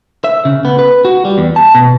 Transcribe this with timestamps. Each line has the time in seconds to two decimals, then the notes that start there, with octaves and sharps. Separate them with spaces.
0.24 E5
0.45 C#3
0.65 B3
0.79 B4
1.05 F#4
1.25 G3
1.38 E2
1.56 A5
1.75 B2